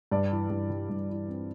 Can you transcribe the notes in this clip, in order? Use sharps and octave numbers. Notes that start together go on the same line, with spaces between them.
G2 D5
E3
G2
G3
G2
E3
C4